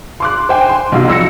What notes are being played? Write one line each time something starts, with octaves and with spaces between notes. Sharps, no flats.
C6 D6 F#6
C5 G5 G#5
C6
B1 C3 F#3 F5
F2 E6 A#6 C#7